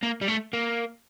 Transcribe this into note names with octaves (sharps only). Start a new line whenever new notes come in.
A#3
G3
A3
A#3